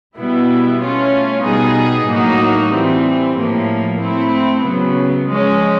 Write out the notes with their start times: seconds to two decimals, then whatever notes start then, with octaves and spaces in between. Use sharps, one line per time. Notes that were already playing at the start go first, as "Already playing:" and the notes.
0.17 B2 G3 B3 E4
0.81 A3 C#4 F4
1.44 B2 G3 B3 D#4 G#4
2.08 A2 F#3 A#3 D#4 F#4
2.72 E3 G3 C4
3.36 A2 F3 A#3
4.00 A3 C4 E4
4.64 C#3 F#3 B3
5.27 F3 G#3 C#4